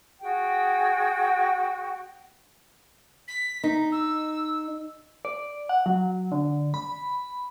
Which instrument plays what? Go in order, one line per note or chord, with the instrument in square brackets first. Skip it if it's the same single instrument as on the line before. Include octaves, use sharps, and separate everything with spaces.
[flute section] F#4 G#4 G5
[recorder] B6
[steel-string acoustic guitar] D#4
[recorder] E6
[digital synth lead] D5
F#5
F#3
D3
B5